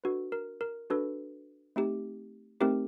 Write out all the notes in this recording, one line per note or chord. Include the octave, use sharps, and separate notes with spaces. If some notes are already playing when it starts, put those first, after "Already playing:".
D4 F#4 A4 B4
A#4
A#4
D4 F#4 A4 B4
A3 C4 D#4 G4
A3 C4 D#4 G4 A#4